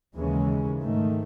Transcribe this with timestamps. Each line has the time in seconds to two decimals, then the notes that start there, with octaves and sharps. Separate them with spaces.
0.17 D#2 C#3 E3 G#3 C#4
0.82 G#2 D#3 A3